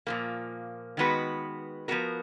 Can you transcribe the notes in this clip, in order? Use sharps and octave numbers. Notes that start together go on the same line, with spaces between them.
A#2 F3 A#3
D#3 G#3 B3 F#4 B4
F3 B3 F#4 A#4